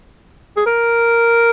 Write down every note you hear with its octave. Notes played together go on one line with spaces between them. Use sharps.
G#4
A#4